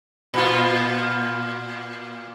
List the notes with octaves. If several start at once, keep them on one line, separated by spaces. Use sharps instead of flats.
A#2 F4